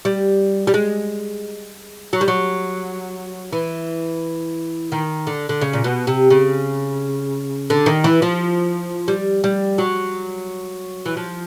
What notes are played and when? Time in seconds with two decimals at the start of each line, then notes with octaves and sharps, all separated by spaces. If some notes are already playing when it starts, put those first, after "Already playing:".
0.05 G3
0.67 G3
0.74 G#3
2.13 F#3
2.21 G3
2.28 F#3
3.53 E3
4.92 D#3
5.27 D3
5.49 D3
5.61 C#3
5.73 A#2
5.84 B2
6.07 C3
6.30 C#3
7.70 D3
7.86 D#3
8.04 E3
8.22 F3
9.08 G3
9.44 G3
9.78 F#3
11.06 E3
11.17 F3